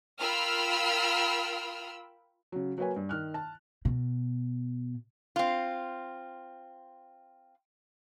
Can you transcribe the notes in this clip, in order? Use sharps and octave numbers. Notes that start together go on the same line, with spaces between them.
F4 A#4 G5 B5 E6 F6
C#3 F#3
F#3 A#3 B4 C#5 G#5
G2
D#3 F6 F#6
A5
B2
C4 F4